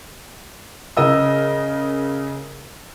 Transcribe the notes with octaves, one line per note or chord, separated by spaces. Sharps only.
C#3 A#4 D#5 E6